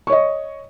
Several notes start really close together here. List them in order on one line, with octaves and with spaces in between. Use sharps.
C#6 C#5 D#5